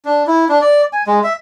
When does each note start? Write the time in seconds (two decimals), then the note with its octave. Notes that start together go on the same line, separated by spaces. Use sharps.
0.05 D4
0.27 E4
0.49 D4
0.61 D5
0.93 G#5
1.07 G#3
1.24 E5